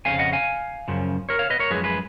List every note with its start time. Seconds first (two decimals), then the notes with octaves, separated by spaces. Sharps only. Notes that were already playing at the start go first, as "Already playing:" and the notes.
0.05 F2 C#3 F3 F5 G#5
0.19 D#5 F#5
0.33 F5 G#5
0.88 F#2 C#3 F3
1.29 A#4 C#5
1.39 C#5 F5
1.50 B4 D#5
1.60 A#4 C#5
1.70 F#2 F3 G#3 G#4 B4
1.84 G#4 B4